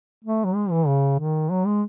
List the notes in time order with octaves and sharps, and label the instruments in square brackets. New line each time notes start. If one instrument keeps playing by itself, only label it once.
[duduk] A3
F#3
G#3
E3
C#3
D#3
F#3
G#3